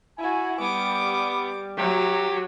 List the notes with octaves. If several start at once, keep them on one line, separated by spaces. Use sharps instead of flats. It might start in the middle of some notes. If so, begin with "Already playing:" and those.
E4 F#4 G#5
G3 B3 D6
F#3 G4 E5 A#5